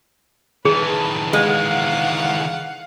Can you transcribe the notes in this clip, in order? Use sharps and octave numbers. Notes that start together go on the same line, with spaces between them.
D#3 E3 G#4 B4 A5
G#3 F5 F#5